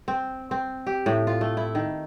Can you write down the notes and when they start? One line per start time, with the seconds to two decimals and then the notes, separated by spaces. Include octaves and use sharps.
0.08 C4
0.51 C4
0.87 G4
1.06 A2
1.27 F4
1.41 A3
1.57 E4
1.75 D#3